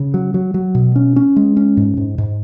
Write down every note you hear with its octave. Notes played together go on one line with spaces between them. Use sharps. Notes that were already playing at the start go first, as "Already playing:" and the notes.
Already playing: C#3
F#3
F#3
F#3
B2
C#4
C#4
G#3
C#4
G#2
G#2
G#2